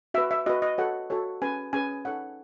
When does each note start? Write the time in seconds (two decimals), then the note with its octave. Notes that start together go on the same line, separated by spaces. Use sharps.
0.14 F#4 B4 E5
0.31 E5
0.46 F#4 B4 D#5
0.62 D#5
0.78 F#4 A4 C#5 F#5
1.10 F#4 A4 C#5
1.41 C#4 G#4 B4 G#5
1.73 C#4 G#4 B4 G#5
2.05 D#4 A4 C#5 F#5